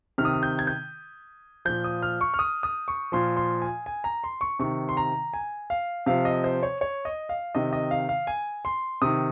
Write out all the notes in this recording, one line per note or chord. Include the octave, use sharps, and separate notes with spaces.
C3 D#3 F6
D#6
F6
G6
G#6
G6
A#2 F3 G6
D#6
F6
C#6
F6
D#6
D#6
C#6
A#2 F3 C6
C6
G#5
G#5
A#5
C6
C#6
C3 D#3 C#6
C6
A#5
G#5
F5
C3 F3 F5
D#5
C5
C#5
C#5
D#5
F5
C3 D#3 D#5
D#5
F5
F5
G#5
C6
C3 D#3 D#6